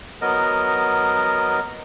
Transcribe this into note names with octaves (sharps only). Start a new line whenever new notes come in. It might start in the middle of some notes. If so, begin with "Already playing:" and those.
F#3 B3 A#4 D#5